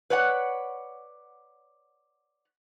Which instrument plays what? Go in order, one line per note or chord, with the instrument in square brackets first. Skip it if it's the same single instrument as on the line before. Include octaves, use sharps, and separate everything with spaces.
[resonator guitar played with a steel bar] B4 C#5 D5 F#5